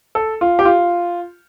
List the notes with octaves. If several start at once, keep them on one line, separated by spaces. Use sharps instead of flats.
A4
F4
G4
F4